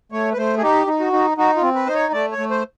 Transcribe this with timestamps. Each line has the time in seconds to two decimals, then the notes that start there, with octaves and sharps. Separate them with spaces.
0.12 A3 C#5
0.33 B4
0.37 A3 C5
0.58 G#4
0.62 D#4 G4
0.87 D#4
1.00 F#4
1.13 D#4
1.38 D#4 F#4
1.56 F4
1.63 C4
1.75 B4
1.86 D#4 C5
1.95 C#5
2.13 A3 D5
2.32 C#5
2.38 A3
2.50 C5